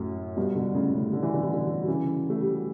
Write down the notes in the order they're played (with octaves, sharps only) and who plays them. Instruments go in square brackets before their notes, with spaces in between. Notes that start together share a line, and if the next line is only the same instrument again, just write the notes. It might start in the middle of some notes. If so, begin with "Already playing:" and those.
Already playing: [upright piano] F#2 A2
G2 B2
B2 D3
A2 C#3
A2 C#3
D3
E3
D3
E3
B2 D3
F#3
C#3 E3
A3
G3
F#3